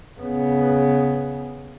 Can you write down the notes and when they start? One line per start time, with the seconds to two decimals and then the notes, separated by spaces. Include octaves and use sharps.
0.19 C#3 B3